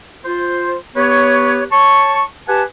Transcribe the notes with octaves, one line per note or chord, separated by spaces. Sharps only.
F4 C5
B3 G4 B4 C#5
C#5 A5 C#6
G4 B4 F#5 G#5 A5